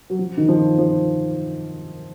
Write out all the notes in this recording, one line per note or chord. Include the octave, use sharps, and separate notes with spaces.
F#3
F3
D#3
F3
F3